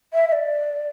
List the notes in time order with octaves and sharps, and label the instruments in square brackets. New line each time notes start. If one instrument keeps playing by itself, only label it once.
[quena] E5
E5
D5